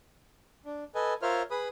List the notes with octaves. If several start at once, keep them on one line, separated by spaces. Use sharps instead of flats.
D4
A4 B4 D#5 G#5
F4 A#4 C5 C#5 E5 F6
G#4 B4 B5 D#6